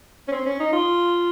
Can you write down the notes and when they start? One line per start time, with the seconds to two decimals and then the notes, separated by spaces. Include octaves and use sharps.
0.28 C#4
0.32 C4
0.46 C#4
0.60 D#4
0.73 F4